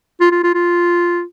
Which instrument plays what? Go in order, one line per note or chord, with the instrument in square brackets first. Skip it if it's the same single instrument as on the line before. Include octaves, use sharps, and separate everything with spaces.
[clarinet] F4
F4
F4
F4